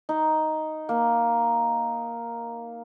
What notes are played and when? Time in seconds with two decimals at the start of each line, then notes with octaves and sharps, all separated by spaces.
0.09 D#4
0.89 A#3